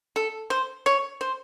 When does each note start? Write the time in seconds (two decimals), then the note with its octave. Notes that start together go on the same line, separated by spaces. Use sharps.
0.16 A4
0.50 C5
0.86 C#5
1.21 C5